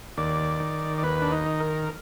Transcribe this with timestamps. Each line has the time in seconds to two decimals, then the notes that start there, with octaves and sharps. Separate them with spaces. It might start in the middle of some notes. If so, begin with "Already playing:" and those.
0.17 D#2 D5
0.60 D#3
0.98 D5
1.03 D#2 B4
1.22 D4
1.32 D#4
1.46 D#3
1.60 A#4